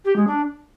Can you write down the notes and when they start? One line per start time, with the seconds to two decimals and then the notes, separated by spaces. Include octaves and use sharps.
0.05 G4
0.16 G#3
0.27 D4